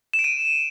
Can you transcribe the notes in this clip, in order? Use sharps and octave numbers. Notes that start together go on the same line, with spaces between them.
E7
D7
D#7